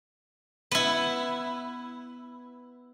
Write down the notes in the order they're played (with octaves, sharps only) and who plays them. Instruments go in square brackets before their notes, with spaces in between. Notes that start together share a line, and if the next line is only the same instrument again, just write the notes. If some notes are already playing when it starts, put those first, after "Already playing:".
[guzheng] B3 E4